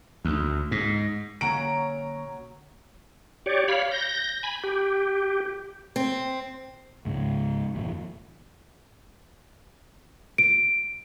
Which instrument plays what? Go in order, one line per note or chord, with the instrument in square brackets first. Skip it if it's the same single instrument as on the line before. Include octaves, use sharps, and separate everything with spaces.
[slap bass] D2
G#2
[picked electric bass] B1 D3 A#3 [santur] F#3 C#4 C#5 [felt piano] A#5 D7
[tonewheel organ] G4 C#5 D5
C#5 F5 B5
G6 A#6
G#5 B5
G4
[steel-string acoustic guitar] C4
[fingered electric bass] C#2 G#2 C#3 G#3
G1 F2 A#2 D#3
[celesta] D7